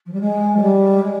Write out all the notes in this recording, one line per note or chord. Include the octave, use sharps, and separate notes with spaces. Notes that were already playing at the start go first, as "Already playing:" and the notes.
F3
G3
G#3
F3
G3
G#3